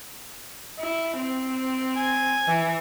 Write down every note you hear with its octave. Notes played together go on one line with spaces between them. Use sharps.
E4
C4
G#5
E3